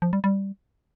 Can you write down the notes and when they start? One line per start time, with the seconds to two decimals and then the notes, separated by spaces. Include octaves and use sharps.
0.02 F3
0.13 G3
0.24 G3